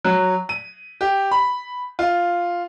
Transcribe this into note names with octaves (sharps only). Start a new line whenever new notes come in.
F#3
D#7
G4
B5
F4